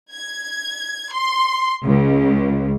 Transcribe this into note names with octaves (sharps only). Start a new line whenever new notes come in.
G#6
C6
C#2